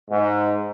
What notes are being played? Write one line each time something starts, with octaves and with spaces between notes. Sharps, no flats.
G#2